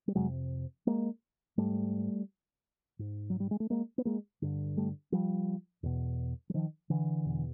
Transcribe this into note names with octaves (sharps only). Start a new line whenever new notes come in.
G3
F2 C3 F#3 G#3
G#3 A#3
G#2 G3 A3
G#2
F#3
G3
G#3
A3
G#3 A#3
B3
G#3 A#3
G2 D3
G3 A3
F3 G3
E2 B2
F#3
D#3 F3
D3 E3
E2 B2